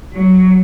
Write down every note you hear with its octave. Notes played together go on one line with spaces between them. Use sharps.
F#3